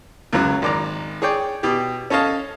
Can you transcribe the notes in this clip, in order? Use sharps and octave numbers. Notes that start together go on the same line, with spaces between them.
C#2 F#2 F#3
G#1 D5 A#5
G#4 C#5 D5 G5
B2 G4
C#4 A4 C#5 D#5 F5 A5